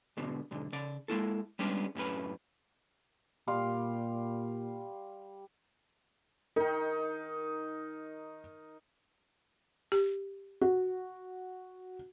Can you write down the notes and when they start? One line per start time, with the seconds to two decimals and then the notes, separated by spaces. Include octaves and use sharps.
0.17 G#2 B2 D3
0.51 B1 G#2 D3
0.73 C#3 D5
1.08 G#3 A#3 E4 A4
1.59 G3 G#3 B3 C#4 D4
1.95 F#2 A2 C#4 B4
3.48 A#2 G3 F5 C6
6.56 D#3 D#4 A#4
9.92 G4
10.61 F#4